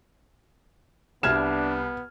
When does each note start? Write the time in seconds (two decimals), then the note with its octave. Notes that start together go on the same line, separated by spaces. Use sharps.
1.23 C2 B3 D4 F6 G#6 E7